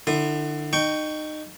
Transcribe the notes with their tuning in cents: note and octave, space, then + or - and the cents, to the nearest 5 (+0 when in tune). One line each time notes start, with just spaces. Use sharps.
D3 +30 E4 +0 D#6 -25
D#4 -25 G5 -10 C#6 +10